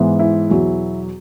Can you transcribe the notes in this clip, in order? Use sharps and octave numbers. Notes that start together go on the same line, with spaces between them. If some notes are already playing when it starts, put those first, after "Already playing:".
Already playing: G#2 E3 G#3 B3
E4
E2 B2 F#3